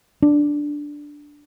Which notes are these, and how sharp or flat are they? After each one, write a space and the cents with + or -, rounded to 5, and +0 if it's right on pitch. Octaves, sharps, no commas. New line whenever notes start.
D4 +0